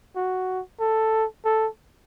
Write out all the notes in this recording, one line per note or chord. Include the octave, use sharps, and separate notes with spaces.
F#4
A4
A4